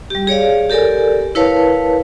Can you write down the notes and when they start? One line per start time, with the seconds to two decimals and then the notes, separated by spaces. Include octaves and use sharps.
0.10 G3 G4
0.27 G#4 C#5 D5 F5
0.70 G4 A4 A#4 D5 G#5
1.35 E4 A#4 B4 C#5 F5 A5